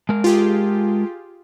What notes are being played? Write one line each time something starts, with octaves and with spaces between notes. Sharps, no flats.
G#3 A#4
F4 G4 G#4